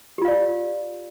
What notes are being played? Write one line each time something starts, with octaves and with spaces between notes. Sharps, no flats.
F4 G4 D5 F5